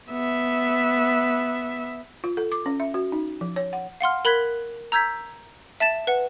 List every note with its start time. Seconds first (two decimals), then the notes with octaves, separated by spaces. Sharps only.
0.10 B3 E5
2.24 F4
2.37 A4
2.52 D6
2.66 C#4
2.80 E5
2.94 F#4
3.12 D#4
3.41 F3
3.56 C#5
3.73 F#5
4.01 F5 F#5 C6 F6
4.25 A#4 B5 F#6 G#6 B6
4.92 A#5 E6 G6 G#6 B6
5.80 E5 A5 A6 E7
6.07 B4 F#5